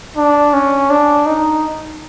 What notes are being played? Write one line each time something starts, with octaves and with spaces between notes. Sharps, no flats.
D4
C#4
D4
D#4